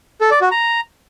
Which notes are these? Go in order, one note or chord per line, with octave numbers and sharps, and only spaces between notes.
A4
D5
F#4
A#5